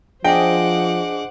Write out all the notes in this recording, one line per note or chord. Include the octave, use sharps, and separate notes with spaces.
F3 D4 G#4 C5 D#5 F#5 G5 D6